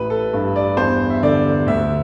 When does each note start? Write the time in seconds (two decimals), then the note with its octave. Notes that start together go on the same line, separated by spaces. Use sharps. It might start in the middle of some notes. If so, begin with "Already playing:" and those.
Already playing: A1 B4
0.10 A4
0.33 G2
0.56 D5
0.77 E2 C5
1.10 E5
1.23 D3 D5
1.67 D2 E5